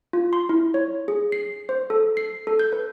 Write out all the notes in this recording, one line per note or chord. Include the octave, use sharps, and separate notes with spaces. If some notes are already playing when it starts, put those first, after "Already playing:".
F4
C6
E4
C#5
G#4
C7
C5
A4
C7
A4
G6
B4